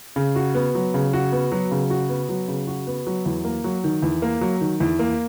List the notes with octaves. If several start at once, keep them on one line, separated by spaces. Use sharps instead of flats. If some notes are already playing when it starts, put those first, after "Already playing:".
C#3
F#4
B3
F#3
C#3
F#4
B3
F#3
C#3
F#4
B3
F#3
C#3
F#4
B3
F#3
E2
A#3
F#3
D#3
E2
A#3
F#3
D#3
E2
A#3